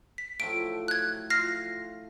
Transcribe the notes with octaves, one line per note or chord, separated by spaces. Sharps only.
B6
A2 F3 F#3 D7
F#6 G#6
F4 F6 A#6 C7